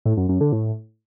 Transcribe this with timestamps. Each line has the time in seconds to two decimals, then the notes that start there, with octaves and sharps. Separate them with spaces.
0.05 A2
0.17 F#2
0.29 F#2
0.41 D3
0.52 A2